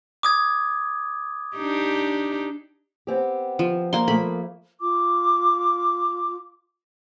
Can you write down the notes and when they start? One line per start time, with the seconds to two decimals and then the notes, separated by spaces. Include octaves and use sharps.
0.23 D6 D#6 G#6
1.57 D4 D#4 G4
3.07 B3 C4 G4
3.59 F3
3.93 A#3 C6
4.08 F3 A3 A#3 B5
4.80 F4 D6